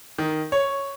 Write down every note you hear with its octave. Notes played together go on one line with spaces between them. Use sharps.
D#3
C#5